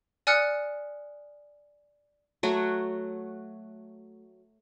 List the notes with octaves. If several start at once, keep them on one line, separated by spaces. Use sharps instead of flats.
D5 G#5 D#6 F6 F#6 C#7
F#3 A3 F#4